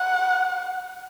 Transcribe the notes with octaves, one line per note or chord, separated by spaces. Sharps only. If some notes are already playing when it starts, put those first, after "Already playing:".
Already playing: F#5